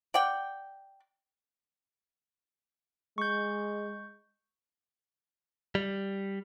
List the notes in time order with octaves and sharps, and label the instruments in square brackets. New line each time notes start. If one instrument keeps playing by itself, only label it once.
[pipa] D5 F#5 G5
[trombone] G#3 [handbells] C#6 G6
[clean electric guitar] G3